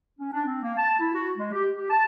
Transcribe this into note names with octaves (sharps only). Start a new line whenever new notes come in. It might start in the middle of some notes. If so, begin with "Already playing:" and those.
C#4
D4
C4
A#3
A5
E4
F#4
G#3
G4
G4
A5